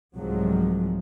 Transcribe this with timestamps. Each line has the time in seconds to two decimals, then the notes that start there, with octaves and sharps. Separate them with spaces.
0.17 C2 G#2 F3 F#3 G#3